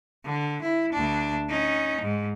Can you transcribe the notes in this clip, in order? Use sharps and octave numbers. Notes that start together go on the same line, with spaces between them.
D3
E4
D2 D4
C#4 D#4
G#2